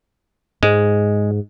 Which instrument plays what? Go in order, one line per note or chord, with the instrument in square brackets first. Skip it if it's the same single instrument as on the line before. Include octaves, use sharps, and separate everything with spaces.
[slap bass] G#2 [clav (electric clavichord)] G#3